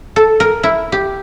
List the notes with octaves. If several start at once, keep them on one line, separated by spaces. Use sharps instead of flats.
A4
A#4
E4
G4